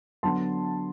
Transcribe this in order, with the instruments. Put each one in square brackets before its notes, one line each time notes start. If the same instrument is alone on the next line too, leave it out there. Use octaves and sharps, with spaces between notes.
[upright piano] D3 F#3 B3 A5 C6